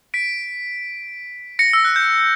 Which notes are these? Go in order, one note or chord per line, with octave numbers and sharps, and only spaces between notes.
B6 D7
A#6 C#7
E6
F#6
G6